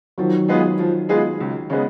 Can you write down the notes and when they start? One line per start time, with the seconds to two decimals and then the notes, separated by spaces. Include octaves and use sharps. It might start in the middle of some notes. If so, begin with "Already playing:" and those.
0.18 D#3 F3 F#3
0.48 G#3 B3 F4 G#4
0.79 F3
1.09 G#3 B3 F4 G#4
1.40 C#2
1.70 C#3 G#3 B3